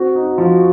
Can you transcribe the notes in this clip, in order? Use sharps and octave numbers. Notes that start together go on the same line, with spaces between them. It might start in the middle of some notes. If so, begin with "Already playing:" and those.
Already playing: C4 F#4
D#4
F3